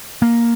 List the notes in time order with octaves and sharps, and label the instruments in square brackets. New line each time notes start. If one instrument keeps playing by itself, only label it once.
[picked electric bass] A#3